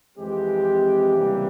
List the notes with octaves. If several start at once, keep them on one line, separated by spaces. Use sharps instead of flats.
F2 E3 G#3 C4 G4
C#2 C3 E3 G3 A#3